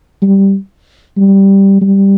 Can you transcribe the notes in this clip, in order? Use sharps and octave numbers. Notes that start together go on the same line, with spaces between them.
G3
G3
G3